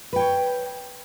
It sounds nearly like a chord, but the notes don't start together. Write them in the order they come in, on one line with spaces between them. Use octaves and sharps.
B4 G5 C#5